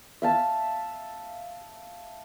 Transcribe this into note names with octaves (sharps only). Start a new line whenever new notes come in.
E5 F5 A5